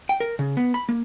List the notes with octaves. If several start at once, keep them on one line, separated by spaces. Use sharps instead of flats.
G5
A#4
C#3
B3
B5
A#3